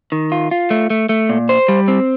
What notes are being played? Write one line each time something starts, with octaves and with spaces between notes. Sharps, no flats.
D#3
F4
F4
A3
A3
A3
A#2
C5
G3
C4